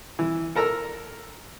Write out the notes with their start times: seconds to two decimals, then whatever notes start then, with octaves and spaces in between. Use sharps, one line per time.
0.19 E3
0.55 A4 A#4 A#5 E6